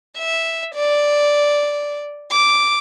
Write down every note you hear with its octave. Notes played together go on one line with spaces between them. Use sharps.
E5
D5
D6